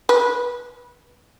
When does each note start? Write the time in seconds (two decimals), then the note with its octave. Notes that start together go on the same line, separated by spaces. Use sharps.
0.09 B4